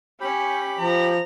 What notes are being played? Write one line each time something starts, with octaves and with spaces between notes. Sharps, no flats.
C#4 G4 B5
F3 A#5